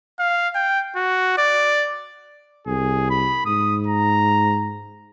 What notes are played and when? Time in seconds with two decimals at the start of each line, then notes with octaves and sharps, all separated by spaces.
0.20 F5
0.55 G5
0.96 F#4
1.38 D5
2.67 C2 G#4
3.10 B5
3.46 G#2 D#6
3.87 A#5